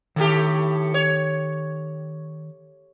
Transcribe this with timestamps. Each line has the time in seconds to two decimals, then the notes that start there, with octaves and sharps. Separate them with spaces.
0.16 A2 D#3 A3 G4 A5
0.94 C#5